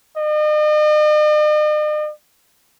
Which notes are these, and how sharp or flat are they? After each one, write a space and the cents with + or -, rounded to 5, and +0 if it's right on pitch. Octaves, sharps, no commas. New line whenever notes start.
D#5 -45